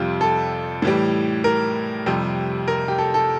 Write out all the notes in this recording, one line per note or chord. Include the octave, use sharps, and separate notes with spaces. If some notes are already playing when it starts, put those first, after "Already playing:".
Already playing: F2 C3 G3 F4
A4
A2 E3 G3
A#4
F2 C3 G3
A#4
G4
A4
A4